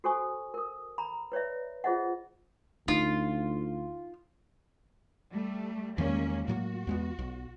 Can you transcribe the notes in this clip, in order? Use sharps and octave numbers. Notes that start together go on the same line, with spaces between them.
F#4 A4 C5 G#5 C#6 D#6
A#4 D#6
A#5 B5
B4 C#5 D5 E5
F4 G#4 C5 D#5 E5 F#5
D2 D#4 F4
G3 A3
E2 D#3 G3 G#3 A#3 C#4
A2 F#3 A#3 F#4
E2 G#3 B3
B1